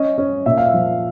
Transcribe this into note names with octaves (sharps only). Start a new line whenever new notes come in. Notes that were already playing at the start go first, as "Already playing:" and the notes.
Already playing: C#4 D#5
C#4
A#2 E5
F5
E5
F3